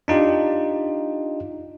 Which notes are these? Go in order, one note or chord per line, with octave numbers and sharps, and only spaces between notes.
D4 D#4 F4 G4